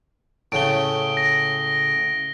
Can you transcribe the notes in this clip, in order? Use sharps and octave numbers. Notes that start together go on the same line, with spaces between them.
A2 C#3 D7 G7
A#6